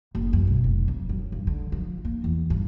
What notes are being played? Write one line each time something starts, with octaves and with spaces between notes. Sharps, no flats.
F#1
F#2
B1
F1
F2
F#2
G2
D3
F3
A#3
E2
G2